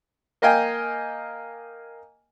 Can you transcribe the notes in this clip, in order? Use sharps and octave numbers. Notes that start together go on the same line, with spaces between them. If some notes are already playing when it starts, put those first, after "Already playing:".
A#3 D#5 F5 G5 G#5